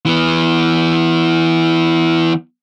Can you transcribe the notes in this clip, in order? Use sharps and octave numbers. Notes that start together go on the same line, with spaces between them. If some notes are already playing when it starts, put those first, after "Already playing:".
E3 B3